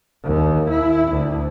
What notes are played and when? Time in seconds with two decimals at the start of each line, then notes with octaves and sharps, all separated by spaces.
0.24 D#2
0.70 E4
1.12 D2